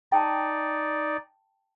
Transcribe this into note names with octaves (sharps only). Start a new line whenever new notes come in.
D#4 D5 G5 A5